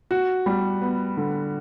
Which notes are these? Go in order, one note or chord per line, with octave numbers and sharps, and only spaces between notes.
F#4
G3
B3
D3